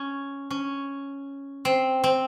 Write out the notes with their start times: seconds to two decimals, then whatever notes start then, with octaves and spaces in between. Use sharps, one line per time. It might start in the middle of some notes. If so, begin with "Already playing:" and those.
Already playing: C#4
0.50 C#4
1.65 C4
2.04 C4